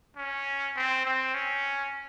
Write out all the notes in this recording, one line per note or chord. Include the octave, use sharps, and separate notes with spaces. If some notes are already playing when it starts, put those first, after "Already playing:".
C#4
C4
C4
C#4